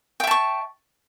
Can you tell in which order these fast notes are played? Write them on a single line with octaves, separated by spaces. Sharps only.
G5 E5 A5 C#6